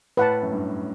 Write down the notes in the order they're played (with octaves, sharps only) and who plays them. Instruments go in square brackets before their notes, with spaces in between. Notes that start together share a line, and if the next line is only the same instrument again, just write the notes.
[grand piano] A2 [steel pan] B4 F#5 A5
[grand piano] F#2
G2